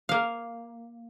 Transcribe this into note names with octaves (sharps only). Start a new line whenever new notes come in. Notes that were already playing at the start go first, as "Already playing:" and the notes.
A#3 F5